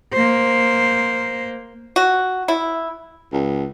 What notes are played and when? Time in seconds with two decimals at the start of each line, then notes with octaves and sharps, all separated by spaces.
0.13 A#3 C5
1.96 F#4
2.48 E4
3.33 C#2